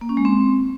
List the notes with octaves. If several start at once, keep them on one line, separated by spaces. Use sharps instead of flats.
A#3
C#4
G#3
C4